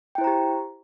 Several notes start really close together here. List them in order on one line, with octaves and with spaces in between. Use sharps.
G5 E4 C5 A#5 G4